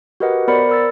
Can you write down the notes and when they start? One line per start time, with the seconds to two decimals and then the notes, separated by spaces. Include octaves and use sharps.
0.20 F#4 G4 A#4 B4 D#5 F#5
0.48 B3 A#4 C5 D5 B5 C#7
0.69 A#4 E6 A6